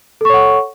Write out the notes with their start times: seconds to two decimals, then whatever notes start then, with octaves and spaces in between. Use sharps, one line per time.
0.21 A4
0.25 C#6
0.29 C#5
0.34 F#5